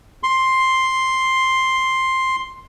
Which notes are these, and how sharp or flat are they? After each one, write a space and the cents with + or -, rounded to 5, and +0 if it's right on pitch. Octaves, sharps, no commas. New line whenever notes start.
C6 +5